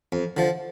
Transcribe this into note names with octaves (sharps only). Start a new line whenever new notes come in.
F2
D3 F3